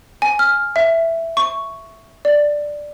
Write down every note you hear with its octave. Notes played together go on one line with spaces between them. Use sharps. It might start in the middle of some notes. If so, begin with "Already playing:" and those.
G#5
F6
E5
C#6
D5